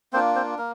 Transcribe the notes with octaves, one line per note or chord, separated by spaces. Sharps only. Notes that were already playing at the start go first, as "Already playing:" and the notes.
A#3 C4 D4 F4 C5
C4 C5
A#3 A#4